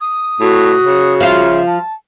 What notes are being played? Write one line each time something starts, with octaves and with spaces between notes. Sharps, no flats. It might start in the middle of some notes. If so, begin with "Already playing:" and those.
D#6
A2 F#4
C#3
F3 F4 E5
A5